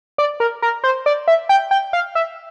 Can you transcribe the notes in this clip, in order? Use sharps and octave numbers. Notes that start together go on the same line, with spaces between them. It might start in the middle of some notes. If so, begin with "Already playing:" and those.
D5
A#4
A#4
C5
D5
E5
G5
G5
F5
E5